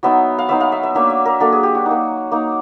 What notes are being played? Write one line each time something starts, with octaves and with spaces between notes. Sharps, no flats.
F#3 B3 D#4 E5
F5
F#3 B3 D#4 E5
F5
E5
E5
F#3 A#3 D4 E5
E5
A#4
F#3 A#3 D4 A4
G#4
G4
F#4
D#4
A#3
A#3 D#4